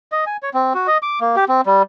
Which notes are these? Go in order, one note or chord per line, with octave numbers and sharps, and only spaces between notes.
D#5
G#5
C#5
C4
F#4
D#5
D6
A#3
G4
C4
G3